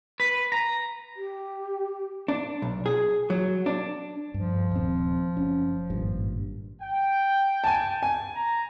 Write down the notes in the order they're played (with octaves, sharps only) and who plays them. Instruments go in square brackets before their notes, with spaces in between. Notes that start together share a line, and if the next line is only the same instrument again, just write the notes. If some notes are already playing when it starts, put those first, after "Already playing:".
[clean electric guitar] B4
A#5
[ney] G4
[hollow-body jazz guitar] D4
B1
G#4
F#3
D4
[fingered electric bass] G2 [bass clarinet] F3
[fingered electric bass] D#1 C4
F#1 C#4
G#1 G2 A#2
[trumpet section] G5
[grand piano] G#5 A5
G#5
[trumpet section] A#5